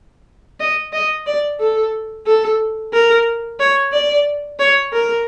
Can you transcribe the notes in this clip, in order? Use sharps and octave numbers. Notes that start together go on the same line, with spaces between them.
D#5
D#5
D5
A4
A4
A#4
C#5
D5
C#5
A#4